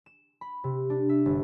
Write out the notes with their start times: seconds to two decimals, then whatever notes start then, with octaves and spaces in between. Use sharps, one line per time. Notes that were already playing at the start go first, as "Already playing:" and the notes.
0.06 E7
0.41 B5
0.64 C3
0.90 D4
1.09 E5
1.26 G1